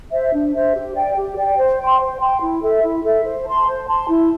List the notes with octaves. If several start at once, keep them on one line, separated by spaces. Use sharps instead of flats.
C5 E5
D4
C5 E5
G4
D5 G5
G4
D5 G5
C5
G5 C6
C5
G5 C6
E4
A4 E5
E4
A4 E5
C5
A5 C6
C5
A5 C6
E4